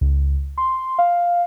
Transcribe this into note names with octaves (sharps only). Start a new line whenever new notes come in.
C#2
C6
F5